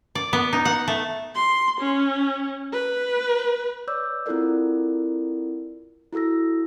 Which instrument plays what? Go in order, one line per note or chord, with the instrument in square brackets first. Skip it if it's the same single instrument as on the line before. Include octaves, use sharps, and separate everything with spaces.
[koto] D5
B3
D#4
F#5
A3
[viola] C6
C#4
B4
[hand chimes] B4 C#5 D5 D6 E6 G6
C4 E4 F4 A4 A#4 D5
E4 F#4 A4 E6 A#6